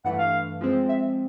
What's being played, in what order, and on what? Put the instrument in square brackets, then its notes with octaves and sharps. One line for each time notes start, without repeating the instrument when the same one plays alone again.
[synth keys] G2 E3 A3 [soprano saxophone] F#5
[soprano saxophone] F5
[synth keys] F3 G#3 C4
[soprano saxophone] E5